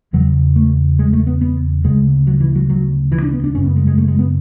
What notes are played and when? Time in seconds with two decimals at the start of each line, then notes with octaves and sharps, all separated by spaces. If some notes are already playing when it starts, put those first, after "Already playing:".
0.13 E2 C#3 F#3
0.56 A3
0.99 G#3
1.13 A3
1.27 B3
1.41 B3
1.84 D2 C#3 G#3
2.27 F#3
2.40 E3
2.55 F#3
2.70 F#3
3.12 E3
3.23 D4
3.33 B3
3.44 D4
3.55 F#2 C#3 C#4
3.66 B3
3.76 G#3
3.87 G#3
3.98 A3
4.08 G#3
4.19 B3